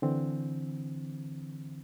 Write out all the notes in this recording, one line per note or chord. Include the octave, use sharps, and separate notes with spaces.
D3 E3 C4